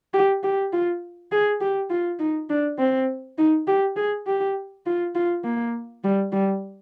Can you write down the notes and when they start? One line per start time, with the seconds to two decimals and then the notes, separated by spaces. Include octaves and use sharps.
0.14 G4
0.43 G4
0.73 F4
1.32 G#4
1.61 G4
1.90 F4
2.19 D#4
2.50 D4
2.79 C4
3.38 D#4
3.67 G4
3.96 G#4
4.27 G4
4.86 F4
5.15 F4
5.44 A#3
6.04 G3
6.32 G3